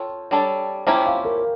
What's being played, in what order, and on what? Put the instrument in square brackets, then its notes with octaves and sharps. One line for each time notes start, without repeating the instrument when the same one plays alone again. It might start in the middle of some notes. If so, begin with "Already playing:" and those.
Already playing: [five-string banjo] F4 A4 C#5 [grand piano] G5
[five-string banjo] G3 D4 A4 C#5
[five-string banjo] F3 A#3 C#4 E4 G4 [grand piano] G5
[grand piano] F5
A#4